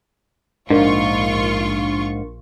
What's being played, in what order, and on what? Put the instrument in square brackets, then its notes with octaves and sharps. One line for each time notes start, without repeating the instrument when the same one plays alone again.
[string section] A#1 F4 C#6 [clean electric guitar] G#2 [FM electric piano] D4 A#4